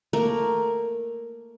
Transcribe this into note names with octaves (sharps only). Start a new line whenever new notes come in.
A3 A#3 A#4